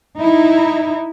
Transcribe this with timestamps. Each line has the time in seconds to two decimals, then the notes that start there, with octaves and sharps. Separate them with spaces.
0.17 D#4 E4